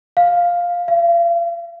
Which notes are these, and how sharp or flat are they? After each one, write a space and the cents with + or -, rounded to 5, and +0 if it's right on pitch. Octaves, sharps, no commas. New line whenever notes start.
F5 +5
F5 -40